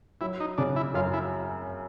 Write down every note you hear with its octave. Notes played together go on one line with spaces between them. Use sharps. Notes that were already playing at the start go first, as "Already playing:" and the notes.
F#3 E4
D#4
C#3 D4
E4
F#2 F4
E4